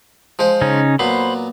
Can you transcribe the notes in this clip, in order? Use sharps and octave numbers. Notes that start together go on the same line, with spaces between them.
F3 G#3 C5
C#3 C#4 D#4
A#2 F#3 B3 C5 B5